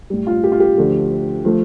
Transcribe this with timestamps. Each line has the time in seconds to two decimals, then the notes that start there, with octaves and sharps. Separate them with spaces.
0.10 A2 G3
0.27 F4
0.44 G4
0.52 F4
0.60 G4
0.77 D2 D3 F3 A3
1.45 F3 A3